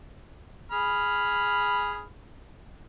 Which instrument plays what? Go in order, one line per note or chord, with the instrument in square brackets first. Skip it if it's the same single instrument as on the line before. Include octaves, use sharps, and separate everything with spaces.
[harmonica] G#4 B5 F6